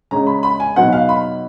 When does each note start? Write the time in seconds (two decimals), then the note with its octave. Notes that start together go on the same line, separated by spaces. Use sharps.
0.11 C#3 G#3 C#4 A#5
0.27 B5
0.43 B5
0.60 G#5
0.76 B2 F#3 B3 D#4 F#5
0.92 F5
1.09 B5